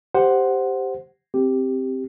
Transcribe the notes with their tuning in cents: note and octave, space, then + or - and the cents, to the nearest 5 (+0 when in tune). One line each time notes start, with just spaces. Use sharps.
G4 +0 C5 +0 F#5 +0
C4 +0 G4 +0